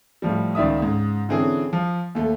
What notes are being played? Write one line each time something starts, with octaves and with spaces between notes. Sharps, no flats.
A2 F3 G3
C#2 D#3 D5 E5 D#6
G#2 C#3
D3 E3 C4 C#4 G#4
F3
D#2 A3